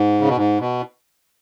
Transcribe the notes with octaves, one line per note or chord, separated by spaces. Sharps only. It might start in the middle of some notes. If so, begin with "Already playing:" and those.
Already playing: G#2
C#3
B2
G#2
B2